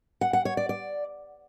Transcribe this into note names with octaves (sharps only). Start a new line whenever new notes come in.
F#5
F#5
C#5
D5
D5